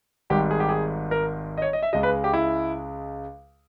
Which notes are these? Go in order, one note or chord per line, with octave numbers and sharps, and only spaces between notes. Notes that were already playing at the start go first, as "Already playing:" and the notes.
G#1 G#2 G3 G4
G#4
G4
G#4
A#4
D#5
C#5
D#5
E5
C#2 C#3 G#3 D#5
B4
G4
E4